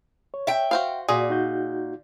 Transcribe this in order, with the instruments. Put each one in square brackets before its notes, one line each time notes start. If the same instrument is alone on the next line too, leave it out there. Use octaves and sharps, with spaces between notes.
[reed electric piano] C#5
[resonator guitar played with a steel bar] E5 G5
[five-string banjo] F#4 C5 F5
[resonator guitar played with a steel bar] A#2 [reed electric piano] F#4 D5 [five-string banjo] G#4
[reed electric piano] D#4 F#4 G6